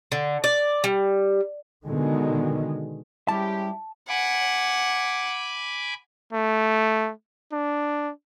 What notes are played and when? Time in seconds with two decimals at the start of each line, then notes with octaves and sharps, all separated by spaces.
0.12 D3
0.44 D5
0.84 G3
1.85 B2 D3 D#3 G#3
3.28 G3 G#3 C#4 E4 G4 A5
4.09 F#5 G#5 B5 D6
6.33 A3
7.52 D4